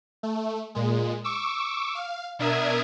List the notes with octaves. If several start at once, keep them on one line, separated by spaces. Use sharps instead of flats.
A3
A#2 G#3
C#6 D6 E6
F5
B2 D4 A#4 E5 D#6 G#6